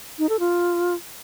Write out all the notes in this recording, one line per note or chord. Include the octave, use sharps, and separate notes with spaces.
D#4
A4
F4